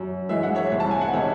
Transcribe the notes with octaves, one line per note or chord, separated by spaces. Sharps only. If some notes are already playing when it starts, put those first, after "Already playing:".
Already playing: F#2
E3 G#3 E5
F#5
C#5 E5
C2
A5
G#5
F#5
C3 D#3 G#3 C#5 E5